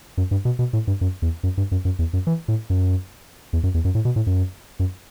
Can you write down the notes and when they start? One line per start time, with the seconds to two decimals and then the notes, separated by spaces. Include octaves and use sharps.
0.18 F#2
0.31 G2
0.45 B2
0.59 B2
0.73 A2
0.87 G2
1.01 F#2
1.22 E2
1.43 F#2
1.57 G2
1.72 F#2
1.85 F#2
1.99 E2
2.13 F#2
2.27 E3
2.48 A2
2.70 F#2
3.53 E2
3.63 F#2
3.74 E2
3.85 F#2
3.95 A2
4.05 B2
4.16 A2
4.27 F#2
4.80 F#2